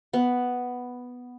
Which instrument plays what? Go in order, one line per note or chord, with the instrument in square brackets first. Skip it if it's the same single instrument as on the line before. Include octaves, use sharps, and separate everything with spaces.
[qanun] B3